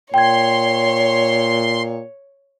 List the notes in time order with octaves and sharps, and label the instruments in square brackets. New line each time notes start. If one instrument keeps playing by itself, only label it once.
[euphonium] A#2 [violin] C#5 [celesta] G5 G#6 [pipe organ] C6